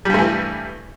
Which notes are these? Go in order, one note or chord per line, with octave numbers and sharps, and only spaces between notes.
G2 E3 G3 A3